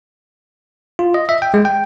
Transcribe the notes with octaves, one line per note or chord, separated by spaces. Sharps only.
F4
D#5
E5
G5
G#3
G5